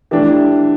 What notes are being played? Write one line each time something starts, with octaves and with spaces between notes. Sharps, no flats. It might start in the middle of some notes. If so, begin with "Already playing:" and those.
E3 A3 D4 G4